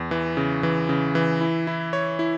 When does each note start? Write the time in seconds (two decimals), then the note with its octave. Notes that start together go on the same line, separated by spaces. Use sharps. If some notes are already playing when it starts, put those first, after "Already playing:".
Already playing: E2
0.11 E3
0.37 C#3
0.63 E3
0.89 C#3
1.15 E3
1.41 E4
1.67 E4
1.93 C#5
2.19 E4